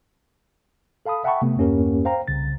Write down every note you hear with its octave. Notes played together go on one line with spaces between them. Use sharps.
A4 F5 A5 B5 D#6
E5 F#5 G5 A5 B5 C#6
C3 A3 B3
E2 G2 A#3 C#4 G4 A#4
C5 F5 G5 A#5
C2 C#3 A6